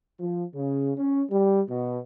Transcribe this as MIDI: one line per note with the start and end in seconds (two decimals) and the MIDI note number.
0.19 0.44 53
0.53 0.92 49
0.97 1.22 61
1.30 1.61 55
1.68 1.98 47